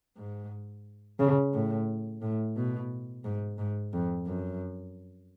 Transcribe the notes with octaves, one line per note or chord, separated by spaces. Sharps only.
G#2
C#3
A2
A2
B2
G#2
G#2
F2
F#2